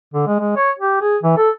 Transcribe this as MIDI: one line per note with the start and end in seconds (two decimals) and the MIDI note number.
0.14 0.26 50
0.27 0.37 56
0.40 0.54 56
0.57 0.70 73
0.79 0.97 67
1.01 1.17 68
1.23 1.34 52
1.37 1.50 69